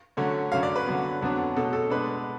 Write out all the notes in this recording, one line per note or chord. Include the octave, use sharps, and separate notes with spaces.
D3 F#3 A3 C#4
F#2 D3 F#3 C#4 F5
D5
B4
D3 F#3 B3
F2 D3 F#3 B3 D4
B2 F#3 A3 A4
A4
B2 G#3 D4 B4